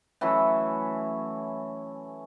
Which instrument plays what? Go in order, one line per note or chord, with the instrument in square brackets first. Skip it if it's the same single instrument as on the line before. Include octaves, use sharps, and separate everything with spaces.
[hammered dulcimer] E3 F#3 A3 C#4